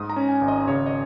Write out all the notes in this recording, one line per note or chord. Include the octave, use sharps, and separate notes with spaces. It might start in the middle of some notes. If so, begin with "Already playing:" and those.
Already playing: G#2 D#6
A#5
C#4
G#5
G#1
D#5
C#3 C#5
D#5